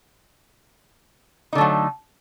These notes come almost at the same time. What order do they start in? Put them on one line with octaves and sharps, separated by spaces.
D#4 D3 A3 F#3